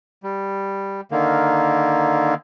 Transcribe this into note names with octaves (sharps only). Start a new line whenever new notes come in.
G3
D3 D#3 A#3